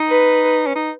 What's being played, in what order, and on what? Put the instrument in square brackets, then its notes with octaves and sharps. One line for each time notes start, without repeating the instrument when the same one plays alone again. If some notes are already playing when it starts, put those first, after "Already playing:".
Already playing: [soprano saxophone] D#4
[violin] B4
[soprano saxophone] C#4
D#4